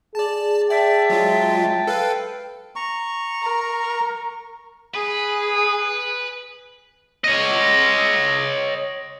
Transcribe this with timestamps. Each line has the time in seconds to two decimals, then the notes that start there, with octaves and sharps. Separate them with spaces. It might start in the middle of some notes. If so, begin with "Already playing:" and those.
0.15 G#4 D5 A5
0.70 D5 E5 G5 A5
1.10 F#3 G#3 F4
1.87 A4 B4 F5
2.76 A#5 C#6
3.41 A#4
4.94 G#4 B4
7.24 C#5 D#5